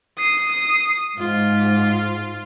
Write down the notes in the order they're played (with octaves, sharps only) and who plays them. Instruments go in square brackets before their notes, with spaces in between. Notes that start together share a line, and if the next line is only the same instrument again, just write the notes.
[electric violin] D#6 C7
[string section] G#2 [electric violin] F4